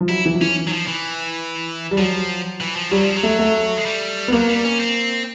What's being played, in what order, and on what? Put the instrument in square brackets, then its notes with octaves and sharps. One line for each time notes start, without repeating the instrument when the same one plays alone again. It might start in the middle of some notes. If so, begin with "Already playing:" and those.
[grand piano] F3
[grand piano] F#3 [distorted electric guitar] E4
[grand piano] E3
F3
[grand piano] E3 [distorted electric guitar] C#4
[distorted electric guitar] F#3
F3
E3
[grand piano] G3
[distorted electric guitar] F3 [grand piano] F#3
[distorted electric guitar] E3
F3
[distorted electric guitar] F#3 [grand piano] G3
[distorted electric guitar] F3
F#3
[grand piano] A3
A3
[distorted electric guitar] G#3
G3
[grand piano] B3
[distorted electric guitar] F#3 [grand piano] A#3
[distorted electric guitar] G3
C#4
C4